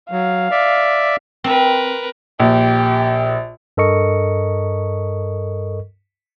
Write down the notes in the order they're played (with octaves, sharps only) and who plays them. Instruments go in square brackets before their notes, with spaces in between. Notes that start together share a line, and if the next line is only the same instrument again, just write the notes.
[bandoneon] F#3 [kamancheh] F5
[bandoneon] D5 E5
[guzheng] C4 [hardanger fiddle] A#4 B4
[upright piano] A#1 [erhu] G4
[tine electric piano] G2 A4 A#4 D#5 C#6 C#7